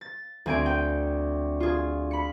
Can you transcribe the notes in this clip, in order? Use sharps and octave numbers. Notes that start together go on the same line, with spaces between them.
A6
D2 C4 G#5 G#6 D7
G5
F4 G#4
B5 C#7